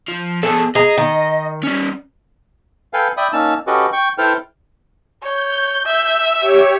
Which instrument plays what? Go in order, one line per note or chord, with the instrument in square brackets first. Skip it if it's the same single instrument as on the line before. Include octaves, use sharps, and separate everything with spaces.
[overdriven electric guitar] F3
[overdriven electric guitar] B2 G#4 [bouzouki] A4
[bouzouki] G#4 A#5 [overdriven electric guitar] D#5
[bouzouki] D#3
[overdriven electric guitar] G3 C#4
[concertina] A4 B4 F5 G5 G#5
D5 E5 G5 B5 D#6
A#3 C#4 D#4 A5 E6
C#4 F#4 G4 A4 B4 D#5
G5 C#6
E4 A4 B4 C5 G5 F6
[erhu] C#5 [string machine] G6
[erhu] E5
[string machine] G4 C#5